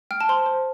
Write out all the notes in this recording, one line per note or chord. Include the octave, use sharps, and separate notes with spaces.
G5 F6
A5
C5 C6
C5